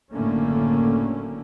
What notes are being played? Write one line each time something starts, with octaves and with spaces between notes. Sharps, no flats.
F#1 A2 D3 A3 A#3 C#4